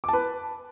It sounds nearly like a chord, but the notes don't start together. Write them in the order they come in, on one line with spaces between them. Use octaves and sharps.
D6 A5 B4